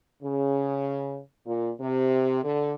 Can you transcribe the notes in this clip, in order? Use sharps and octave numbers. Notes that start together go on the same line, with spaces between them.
C#3
A#2
C3
D3